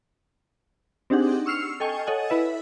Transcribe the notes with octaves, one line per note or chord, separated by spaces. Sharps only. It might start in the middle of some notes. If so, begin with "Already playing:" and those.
C4 D4 D#4 G4 G#4 F#5
C#6 E6 F6 C7 C#7 F7
A4 D#5 G5 G#5 C#6
A4 C#5 D#5 F#5 G#5
E4 B4 E5